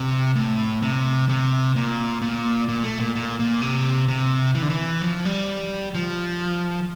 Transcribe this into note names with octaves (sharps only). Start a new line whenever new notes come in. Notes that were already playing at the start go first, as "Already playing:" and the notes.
Already playing: C3
A2
C3
C3
A#2
A#2
A#2
A3
A#2
A#2
A#2
C3
C3
E3
D3
E3
F3
G3
F3